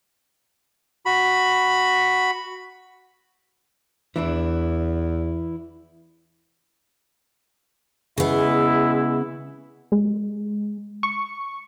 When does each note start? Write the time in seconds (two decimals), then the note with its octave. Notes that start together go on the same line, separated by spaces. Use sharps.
1.06 F#4 B5
4.16 E2 E3 D4 E4
8.18 C#3 G#3 B3 E4
9.92 G#3
11.03 C#6